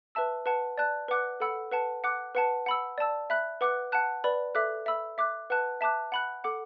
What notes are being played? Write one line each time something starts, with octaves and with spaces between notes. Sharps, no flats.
B4 E5 A5 E6
B4 F#5 A5
D5 A5 F#6
B4 F#5 D6 F#6
A4 F#5 B5 E6
B4 F#5 A5
F#5 D6 F#6
B4 F#5 A5
F#5 B5 E6
D5 A5 E6
E5 B5 F#6
B4 F#5 D6 F#6
F#5 A5 F#6
B4 D5 B5
A4 E5 D6 F#6
E5 B5 E6
E5 D6 F#6
B4 F#5 A5 F#6
E5 A5 D6 F#6
F#5 B5 F#6
A4 F#5 D6